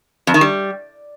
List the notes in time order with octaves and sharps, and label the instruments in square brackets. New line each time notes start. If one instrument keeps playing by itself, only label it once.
[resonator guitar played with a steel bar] F2
D#3
G3